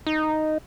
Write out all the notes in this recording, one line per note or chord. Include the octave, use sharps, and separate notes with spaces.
D#4